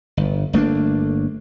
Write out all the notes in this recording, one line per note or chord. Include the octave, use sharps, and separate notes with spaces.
G1
G1 A3 A#3 D4